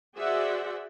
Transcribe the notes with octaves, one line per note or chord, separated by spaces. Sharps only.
F#4 G#4 C5 D5 E5 F#5